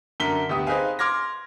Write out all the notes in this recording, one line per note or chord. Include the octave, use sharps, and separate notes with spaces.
F#2 D3 A#4 B6 G7
D2 B3 G4 D#6
C4 D#4 G#4 B4 F5 G#5
C6 D6 F6 G#6 A#6